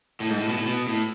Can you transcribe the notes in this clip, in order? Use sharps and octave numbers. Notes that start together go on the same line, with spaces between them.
A2
G#2
A2
B2
A2
B2
A2